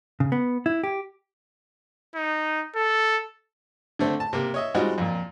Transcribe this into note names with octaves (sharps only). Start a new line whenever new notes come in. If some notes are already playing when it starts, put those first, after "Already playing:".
C#3
B3
E4
G4
D#4
A4
D3 A3 C4
A5
C3 A#3
C#5 D#5 E5
G3 G#3 C4 D#4 F4 F#4
F2 A#2